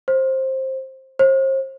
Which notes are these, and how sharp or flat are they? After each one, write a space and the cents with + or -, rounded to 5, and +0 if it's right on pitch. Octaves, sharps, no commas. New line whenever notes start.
C5 +15
C5 +40